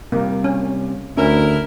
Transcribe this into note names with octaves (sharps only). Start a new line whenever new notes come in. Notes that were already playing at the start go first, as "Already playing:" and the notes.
C3 G3 A#3
C#4
D2 D3 C#4 E4 A#4